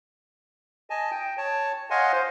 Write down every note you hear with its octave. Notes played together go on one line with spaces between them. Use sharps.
D#5 G#5 A5
G5
C#5 A5
C#5 D#5 F5 F#5 G#5 C6
C5